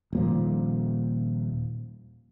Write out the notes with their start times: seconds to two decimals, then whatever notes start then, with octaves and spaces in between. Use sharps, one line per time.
0.13 D#1 A#2 F3